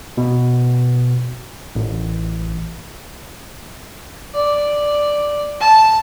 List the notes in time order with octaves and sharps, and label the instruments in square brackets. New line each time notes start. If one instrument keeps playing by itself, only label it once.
[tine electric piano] B2
A1
[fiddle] D5
A5